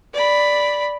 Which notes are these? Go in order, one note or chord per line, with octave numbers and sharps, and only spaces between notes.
D5 B5